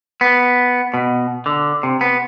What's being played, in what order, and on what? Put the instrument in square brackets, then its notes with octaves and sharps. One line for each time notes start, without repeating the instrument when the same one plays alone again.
[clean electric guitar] B3
B2
D3
C3
B3